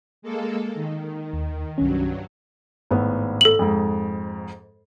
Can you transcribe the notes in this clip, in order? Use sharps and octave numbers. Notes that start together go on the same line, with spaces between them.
G#3 A#3 A4
D#3
D#2
C2 G2 D#3 F#3 C#4
G#1 A2 B3
A4 F#7
F2 G#2